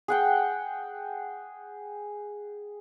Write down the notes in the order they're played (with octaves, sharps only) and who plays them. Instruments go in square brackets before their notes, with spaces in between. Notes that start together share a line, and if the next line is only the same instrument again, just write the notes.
[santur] G#4 F#5 G5